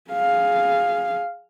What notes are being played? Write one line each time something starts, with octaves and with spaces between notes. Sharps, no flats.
G#4 F5